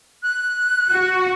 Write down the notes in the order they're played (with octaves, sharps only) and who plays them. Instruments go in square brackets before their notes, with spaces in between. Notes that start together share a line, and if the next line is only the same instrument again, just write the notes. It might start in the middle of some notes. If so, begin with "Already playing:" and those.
[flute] F#6
[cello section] F#4